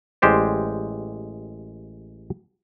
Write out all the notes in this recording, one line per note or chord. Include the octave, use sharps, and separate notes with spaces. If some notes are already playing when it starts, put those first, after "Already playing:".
A1 G#3 G4 C5 D5